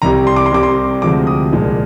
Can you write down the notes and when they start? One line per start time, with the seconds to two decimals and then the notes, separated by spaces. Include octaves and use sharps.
0.02 C2 C3 G3 A#5
0.27 C6
0.36 D6
0.46 C6
0.52 C2 C3 G3 D6
0.63 C6
1.02 D2 C3 F3 G#3 D6
1.27 D#6
1.53 C2 A#2 F3 G#3